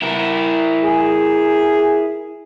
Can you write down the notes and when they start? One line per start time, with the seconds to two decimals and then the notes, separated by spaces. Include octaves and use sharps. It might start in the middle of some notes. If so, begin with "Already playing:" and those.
0.02 E4 A#4
0.84 G#4